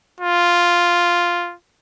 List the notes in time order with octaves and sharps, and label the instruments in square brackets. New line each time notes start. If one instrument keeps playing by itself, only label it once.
[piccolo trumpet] F4